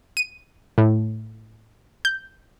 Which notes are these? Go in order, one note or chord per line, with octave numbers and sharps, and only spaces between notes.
D#7
A2
G6